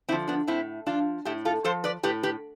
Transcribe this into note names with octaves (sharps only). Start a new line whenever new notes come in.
D3 F3 C4 E4
B3 D4
A2 C4 E4
F3 D4 F4
A2 E4 G4
F4 A4
F3 A4 C5
B4 D5
A2 G4 B4
G4 B4